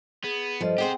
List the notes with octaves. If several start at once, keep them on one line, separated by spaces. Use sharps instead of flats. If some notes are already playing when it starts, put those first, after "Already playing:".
B3 G#4
G2 F3 A4 C5 D#5
C4 G4 G#4 C5 F#5 G5